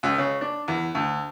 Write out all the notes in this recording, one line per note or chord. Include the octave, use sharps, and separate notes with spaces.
C#2
C#3
D4
E2
D2